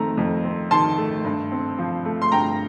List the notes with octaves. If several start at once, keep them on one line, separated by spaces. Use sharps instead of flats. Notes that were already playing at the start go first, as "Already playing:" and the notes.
Already playing: F2 D#3 A3 C4 A#5
F2
C4
D#3 A5 C6
A3
G2
C4
F3
A3
C6
G2 G5 A#5